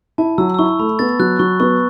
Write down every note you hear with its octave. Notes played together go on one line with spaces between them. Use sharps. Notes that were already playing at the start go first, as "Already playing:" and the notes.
E4 A5
F#3 E6
E6
E4 C#6
A3 B5
B3 A6
F#3 F#6
F#3 C#6
B3 C#6